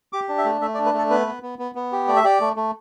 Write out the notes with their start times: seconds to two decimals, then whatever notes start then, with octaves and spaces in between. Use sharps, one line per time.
0.13 G4 D6
0.29 D4
0.38 E5
0.45 A3
0.61 A3 E5
0.74 D5
0.78 D4
0.85 B4
0.94 A3 A4
1.10 B3 B4
1.27 B3
1.42 B3
1.59 B3
1.75 B3
1.92 G4
2.07 A3 D5
2.16 E5
2.24 G4 D5
2.40 A3
2.56 A3